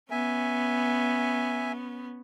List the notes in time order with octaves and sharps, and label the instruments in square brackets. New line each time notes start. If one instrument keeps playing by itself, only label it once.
[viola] B3 C#4 [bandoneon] E5 G#5